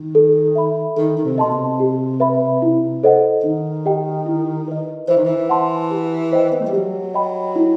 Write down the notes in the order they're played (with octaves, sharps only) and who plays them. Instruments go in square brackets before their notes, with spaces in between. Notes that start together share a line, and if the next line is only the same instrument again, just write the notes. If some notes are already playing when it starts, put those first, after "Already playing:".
Already playing: [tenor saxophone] D#3
[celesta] A4
E5 B5
[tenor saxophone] D#3 [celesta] A4
[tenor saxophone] D#3
C3
[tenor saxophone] B2 [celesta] D#5 A5 C6
[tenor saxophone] C3
[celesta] G4
B4 E5 B5
E4
A4 C5 D#5 F#5
[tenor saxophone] D#3 [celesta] D#4
[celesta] G4 D#5 G5
E4
B4 D#5
[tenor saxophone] E3 [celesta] C5
[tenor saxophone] D#3
E3
[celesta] F#5 A5 C6
G4
C5 D#5 G5
[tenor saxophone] B3
A3
G3
[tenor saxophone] F#3 [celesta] G4
[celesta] D#5 G5 B5
E4